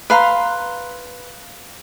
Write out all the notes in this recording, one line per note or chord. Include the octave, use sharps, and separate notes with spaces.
B4 F5 A#5 C6